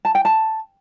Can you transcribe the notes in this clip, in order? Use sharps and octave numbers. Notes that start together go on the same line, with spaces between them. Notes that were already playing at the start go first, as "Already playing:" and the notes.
A5
G5
A5